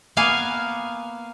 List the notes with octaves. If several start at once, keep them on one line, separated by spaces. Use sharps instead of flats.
A#3 B3 F5 G#5